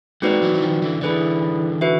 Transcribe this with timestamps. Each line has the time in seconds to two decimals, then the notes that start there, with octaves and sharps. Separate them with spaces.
0.22 G#3 A#3 C4 D#4 F#4 B4 D5
0.41 E3 F#3
0.53 E3
0.62 D#3 F3
0.82 D3 E3
1.01 D3 E3 E4 G#4 B4 D5
1.81 F#4 B4 E5